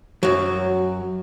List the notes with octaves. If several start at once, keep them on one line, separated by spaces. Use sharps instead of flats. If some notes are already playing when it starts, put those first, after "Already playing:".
F#2 F#3